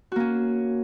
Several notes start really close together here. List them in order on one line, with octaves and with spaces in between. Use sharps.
F#4 A#3 C#4